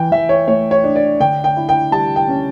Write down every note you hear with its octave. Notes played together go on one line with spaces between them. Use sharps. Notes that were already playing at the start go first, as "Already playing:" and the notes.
Already playing: E3 G5
E3 E5
C#5
A3 C#5
C#5
D4
D5
D3 G5
G5
E4
G5
G3 A5
G5
C#4